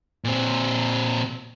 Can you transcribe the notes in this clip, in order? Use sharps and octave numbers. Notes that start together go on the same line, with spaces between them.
A#2 C4